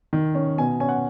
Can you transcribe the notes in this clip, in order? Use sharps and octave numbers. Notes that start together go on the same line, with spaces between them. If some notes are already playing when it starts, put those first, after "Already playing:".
D#3
C#4
B2 G#5
C#4 G#5
F#5